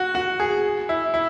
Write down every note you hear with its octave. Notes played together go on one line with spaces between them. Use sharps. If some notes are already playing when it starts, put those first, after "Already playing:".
Already playing: F#4
F#4
G#4
E4
E4